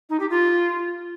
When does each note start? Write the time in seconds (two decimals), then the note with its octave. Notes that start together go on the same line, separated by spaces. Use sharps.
0.09 D#4
0.20 G4
0.30 F4